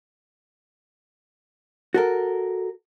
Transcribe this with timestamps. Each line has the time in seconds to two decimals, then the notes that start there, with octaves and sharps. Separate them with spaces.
1.94 F#4 A4 A#4